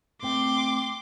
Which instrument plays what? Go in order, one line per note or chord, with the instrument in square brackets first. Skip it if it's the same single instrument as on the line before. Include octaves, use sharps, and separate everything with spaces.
[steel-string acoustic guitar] A3 C4 G5 [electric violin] C6 D6